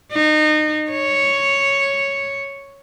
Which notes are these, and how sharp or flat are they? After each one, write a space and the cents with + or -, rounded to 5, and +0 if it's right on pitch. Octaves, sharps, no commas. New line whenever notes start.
D#4 -30
C#5 +0